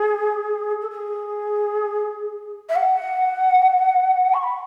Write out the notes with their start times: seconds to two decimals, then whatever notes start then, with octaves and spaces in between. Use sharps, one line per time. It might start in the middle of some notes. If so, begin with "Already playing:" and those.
Already playing: G#4
0.81 A4
0.90 G#4
2.69 E5
2.75 F#5
4.33 C#6
4.43 B5